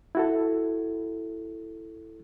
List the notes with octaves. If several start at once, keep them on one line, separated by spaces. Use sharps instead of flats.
E4 F#4 A4